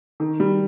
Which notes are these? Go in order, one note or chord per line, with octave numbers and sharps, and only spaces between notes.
D#3
G3